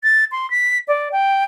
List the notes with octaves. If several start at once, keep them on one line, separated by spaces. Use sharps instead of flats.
A6
C6
B6
D5
G5